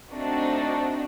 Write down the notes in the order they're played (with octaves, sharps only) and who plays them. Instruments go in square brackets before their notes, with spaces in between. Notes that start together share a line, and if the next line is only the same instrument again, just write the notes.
[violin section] A3 C4 D4 D#4 F#4